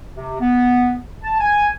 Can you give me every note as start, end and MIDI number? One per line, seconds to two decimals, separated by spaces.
0.16 0.39 48
0.40 0.96 59
1.23 1.38 81
1.40 1.68 80